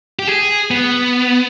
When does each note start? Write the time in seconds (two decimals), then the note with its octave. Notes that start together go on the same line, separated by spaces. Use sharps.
0.19 G4
0.27 G#4
0.71 B3